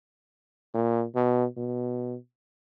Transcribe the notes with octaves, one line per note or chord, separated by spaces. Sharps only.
A#2
B2
B2